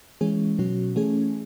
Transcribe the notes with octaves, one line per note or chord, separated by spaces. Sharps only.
E3 G#3 C#4 G#4
B2 F#3 C#4 F#4
E3 A3 C#4 G#4